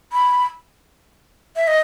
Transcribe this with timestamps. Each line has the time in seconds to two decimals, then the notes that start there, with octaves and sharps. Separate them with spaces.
0.13 B5
1.56 E5
1.68 D#5